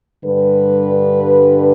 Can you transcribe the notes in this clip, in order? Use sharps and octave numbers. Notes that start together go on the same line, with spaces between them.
G2 D3 G3 B4